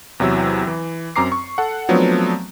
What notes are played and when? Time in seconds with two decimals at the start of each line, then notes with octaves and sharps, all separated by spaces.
0.20 E2 C3 F#3 E4 E6
0.67 E3
1.16 F#2 C4 A#5 D6 C7
1.32 C#6
1.58 A4 F#5
1.89 F3 F#3 A3 B3 C4 D4